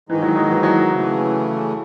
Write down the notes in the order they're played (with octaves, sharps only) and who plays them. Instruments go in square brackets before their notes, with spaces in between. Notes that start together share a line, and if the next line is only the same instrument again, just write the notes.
[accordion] G#2 D#3 G#3 D#4 [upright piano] E3
[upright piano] F#3
F#3
E3
F#3
[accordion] C#3 E3 A3